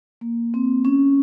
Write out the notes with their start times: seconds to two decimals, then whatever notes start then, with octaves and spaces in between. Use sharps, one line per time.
0.21 A#3
0.54 C4
0.85 C#4